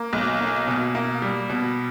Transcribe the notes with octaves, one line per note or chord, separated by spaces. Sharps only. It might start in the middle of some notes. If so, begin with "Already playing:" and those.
Already playing: A#3
B1
A#3
B2
A#3
G3
B2